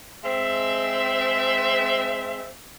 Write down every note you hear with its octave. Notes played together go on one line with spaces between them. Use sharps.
G#3 C4 E5